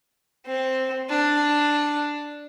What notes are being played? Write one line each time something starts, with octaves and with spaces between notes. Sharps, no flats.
C4
D4